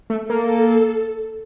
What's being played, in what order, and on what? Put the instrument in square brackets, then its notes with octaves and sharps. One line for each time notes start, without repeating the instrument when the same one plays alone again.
[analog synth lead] A3
[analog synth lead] A#3 [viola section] A4